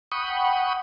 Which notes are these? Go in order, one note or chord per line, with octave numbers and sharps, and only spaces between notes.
F#5 G5 B5 C#6 D#6